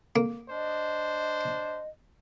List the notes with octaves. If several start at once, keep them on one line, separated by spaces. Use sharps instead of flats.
A#3
D4 C5 D#5